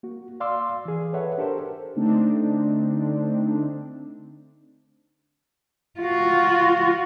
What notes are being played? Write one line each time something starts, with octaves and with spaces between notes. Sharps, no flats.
A#3 F#4
D5 F5 C6 D6 E6
E3 G#4
A4 B4 C#5 E5 F#5
D4 G4 A4 A#4 C5
D3 A3 C4 D4 D#4
F4 F#4